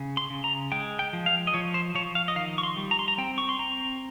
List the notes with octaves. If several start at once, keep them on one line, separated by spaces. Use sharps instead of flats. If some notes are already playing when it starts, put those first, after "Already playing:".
Already playing: C#3
C6
C#3
A#5
G#3 G5
G5
F3
F5
D#5
F3 C#5
C5
F3 C#5
F5
D#5
D#3 F5
C#6
C6
G3
A#5
C6
A#5
C4 G5
C#6
C6
C4 A#5